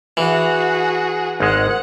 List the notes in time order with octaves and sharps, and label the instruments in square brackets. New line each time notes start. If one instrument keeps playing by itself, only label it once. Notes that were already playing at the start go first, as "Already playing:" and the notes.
[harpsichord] E3 [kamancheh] F#4 G#4
[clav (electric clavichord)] G#1 G#3 [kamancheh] F#5